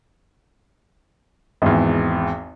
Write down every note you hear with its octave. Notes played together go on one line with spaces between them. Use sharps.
G#1 E2